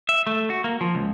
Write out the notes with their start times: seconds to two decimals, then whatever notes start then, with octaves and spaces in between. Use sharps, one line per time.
0.09 E5
0.27 A3
0.50 F#4
0.64 A#3
0.81 F3
0.95 C#2